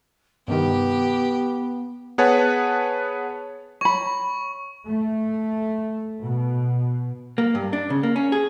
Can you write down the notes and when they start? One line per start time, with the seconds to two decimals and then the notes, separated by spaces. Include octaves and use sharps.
0.48 G2 C3 D#3 B3 G4
2.18 B3 G#4 B4 C#5 F#5 A5
3.81 C#5 B5 C#6
4.87 A3
6.25 B2
7.38 A#3
7.55 G2
7.73 D4
7.90 C#3
8.03 A#3
8.16 C#4
8.32 G#4